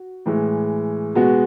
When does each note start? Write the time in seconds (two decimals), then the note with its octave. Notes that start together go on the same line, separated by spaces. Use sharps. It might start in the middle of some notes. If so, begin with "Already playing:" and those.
Already playing: F#4
0.26 A2 E3 G#3
1.15 B2 G#3 B3 F#4